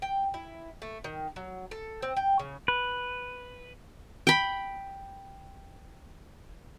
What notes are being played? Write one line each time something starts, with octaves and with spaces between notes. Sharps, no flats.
G5
E4
A3
D#3
F#3
A4
C4
G5
C#3
B4
G5 B5